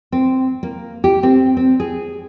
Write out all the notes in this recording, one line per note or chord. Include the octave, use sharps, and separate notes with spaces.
C4
A#3
G4
C4
C4
G#4